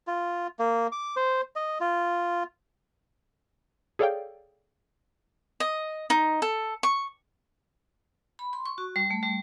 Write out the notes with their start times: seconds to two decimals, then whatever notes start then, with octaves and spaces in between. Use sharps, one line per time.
0.07 F4
0.59 A#3
0.92 D6
1.16 C5
1.56 D#5
1.80 F4
3.99 G#4 A4 C#5 D5 F5 G5
5.60 D#5
6.10 D#4
6.42 A4
6.83 C#6
8.39 B5
8.53 C6
8.66 C#6
8.78 F#4
8.96 G3
9.10 A3
9.23 G3